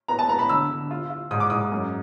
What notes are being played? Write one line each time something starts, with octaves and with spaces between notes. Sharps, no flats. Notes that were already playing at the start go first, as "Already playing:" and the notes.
B3 A#5
A5
B3 A#5
B5
D3 E6
D3
F4
F4
G#2 D#6
D6
G#2 D#6
F#2